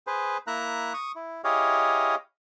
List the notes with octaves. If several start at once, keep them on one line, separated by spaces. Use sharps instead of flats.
G#4 B4 C5
A#3 E4 E5 A#5 F#6
C#6 D#6
E4
E4 G4 G#4 C#5 D#5 F5